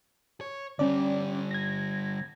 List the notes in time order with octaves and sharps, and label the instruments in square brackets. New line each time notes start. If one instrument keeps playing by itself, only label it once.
[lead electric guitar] C#5
[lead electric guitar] D3 G3 [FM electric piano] C#4 D5
[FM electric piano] G#6 A#6